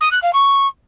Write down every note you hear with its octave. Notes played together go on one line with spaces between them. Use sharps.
D#6
F#6
F5
C#6